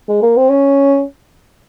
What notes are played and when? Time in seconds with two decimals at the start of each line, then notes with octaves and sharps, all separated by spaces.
0.09 G#3
0.22 A#3
0.37 C4
0.49 C#4